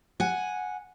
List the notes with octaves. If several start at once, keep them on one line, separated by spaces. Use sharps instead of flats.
F#5 G#5